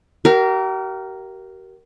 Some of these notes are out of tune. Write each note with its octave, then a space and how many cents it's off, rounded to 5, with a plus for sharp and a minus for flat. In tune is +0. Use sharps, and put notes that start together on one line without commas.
G4 -45 A#4 +0 F5 -45